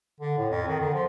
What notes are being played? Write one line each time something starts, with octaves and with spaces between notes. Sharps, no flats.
D3
A2
F2
D#3
D3
F3